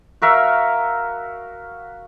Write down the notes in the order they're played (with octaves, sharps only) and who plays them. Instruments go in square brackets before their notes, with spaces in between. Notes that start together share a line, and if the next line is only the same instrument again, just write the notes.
[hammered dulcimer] F#4 A#4 E5 F5